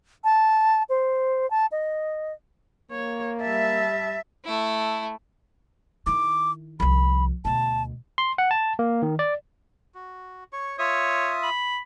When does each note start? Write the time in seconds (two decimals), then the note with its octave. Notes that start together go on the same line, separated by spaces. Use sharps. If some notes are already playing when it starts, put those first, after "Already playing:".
0.24 A5
0.89 C5
1.51 A5
1.72 D#5
2.92 A#3 C#5
3.42 G3 E5 A5
4.45 A3 E4
6.06 D#3 E4 D6
6.80 C2 F3 B5
7.45 D2 B2 A5
8.18 C6
8.38 F#5
8.51 A5
8.79 A#3
9.02 D#3
9.19 D5
9.95 F#4
10.53 C#5 C#6
10.79 F4 C#5 E5 D#6
11.43 B5